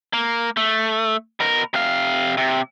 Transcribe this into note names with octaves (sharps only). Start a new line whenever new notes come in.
A#3
A3
B2 A#4
C3 F5
C3